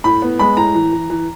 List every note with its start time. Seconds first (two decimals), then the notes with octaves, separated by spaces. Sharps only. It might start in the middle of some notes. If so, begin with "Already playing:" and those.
0.04 A2 B5
0.22 B3
0.39 G#3 B5
0.57 A2 A#5
0.74 E3
0.92 E3
1.10 E3